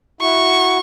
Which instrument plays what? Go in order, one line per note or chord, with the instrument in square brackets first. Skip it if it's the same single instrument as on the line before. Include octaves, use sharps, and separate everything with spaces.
[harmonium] E4 F#4 [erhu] C#6